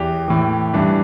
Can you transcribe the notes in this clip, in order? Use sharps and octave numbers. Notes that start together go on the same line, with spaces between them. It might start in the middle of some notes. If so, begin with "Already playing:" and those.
Already playing: E2 E3 G4
A2 E3
G2 E3 D4